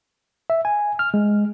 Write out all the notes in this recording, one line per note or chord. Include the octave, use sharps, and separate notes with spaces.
E5
G#5
F6
G#3